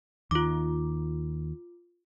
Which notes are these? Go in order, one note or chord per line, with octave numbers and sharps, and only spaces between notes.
D#2 D#3 F4 D6